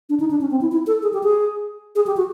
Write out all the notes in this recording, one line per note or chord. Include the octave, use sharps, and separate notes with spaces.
D4
D#4
D4
C#4
C4
E4
E4
A4
G#4
G4
G#4
G#4
G4
F#4